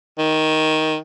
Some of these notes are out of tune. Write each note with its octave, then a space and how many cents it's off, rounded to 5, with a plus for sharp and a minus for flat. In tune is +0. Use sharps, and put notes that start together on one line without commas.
D#3 +10